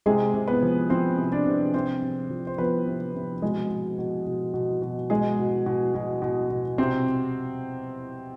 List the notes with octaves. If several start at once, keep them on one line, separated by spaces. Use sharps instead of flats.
C3 G#3 G#4
C3
B3 B4
F3
F3 C4 C5
C3
D4 D5
C3
C3 C4 C5
C3
F3
C5
F3 B3 B4
C3
C3
B2 G#3 G#4
B2
B2
B2
B2
B2
B2 G#3 G#4
B2
B2
B2
B2
B2
C3 C4 C5